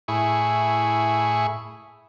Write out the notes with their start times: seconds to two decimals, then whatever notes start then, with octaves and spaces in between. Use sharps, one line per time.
0.08 A2 E4 G#4 C#6